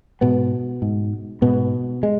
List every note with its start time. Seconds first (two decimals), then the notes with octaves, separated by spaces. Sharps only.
0.21 G#2 B2 B3
0.82 G#2
1.42 G#2 B2 B3
2.03 G#3